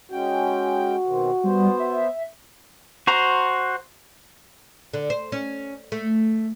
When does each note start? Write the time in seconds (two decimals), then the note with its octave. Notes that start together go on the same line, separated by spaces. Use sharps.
0.11 G#3 C#4 F#4 G5
1.07 B2 D#3 C4
1.44 G3 B3 C5
1.80 E5
3.07 F#4 C5 A#5
4.93 D3
5.10 C5
5.32 C#4
5.92 A3